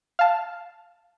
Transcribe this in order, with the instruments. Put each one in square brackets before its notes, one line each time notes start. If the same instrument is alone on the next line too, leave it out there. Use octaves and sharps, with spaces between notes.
[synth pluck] F5 A5